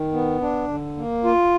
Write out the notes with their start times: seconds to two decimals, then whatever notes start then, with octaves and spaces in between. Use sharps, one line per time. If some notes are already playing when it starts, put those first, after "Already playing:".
Already playing: D#3
0.13 B3
0.41 D4
0.68 D3
0.97 A#3
1.24 F4